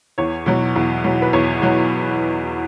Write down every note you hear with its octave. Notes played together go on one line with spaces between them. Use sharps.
E2 C#5
B2 F#3
E2
B2 F#3
B4
E2 C#5
B2 F#3